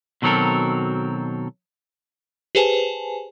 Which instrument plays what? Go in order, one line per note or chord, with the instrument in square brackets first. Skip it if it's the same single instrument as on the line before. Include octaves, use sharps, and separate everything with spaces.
[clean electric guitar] B2 D#3 F#3 C4 A4 A#4
[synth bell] G4 G#4 B4 C5 G#5 A5